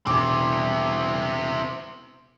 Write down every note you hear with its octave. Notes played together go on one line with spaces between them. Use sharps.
E1 C4 E4 D6